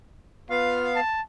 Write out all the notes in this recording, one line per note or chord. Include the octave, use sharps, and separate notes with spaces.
B3 F4 F5
A5